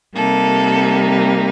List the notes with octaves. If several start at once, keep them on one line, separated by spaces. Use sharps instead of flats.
C3 G3 A#3 D#4 A4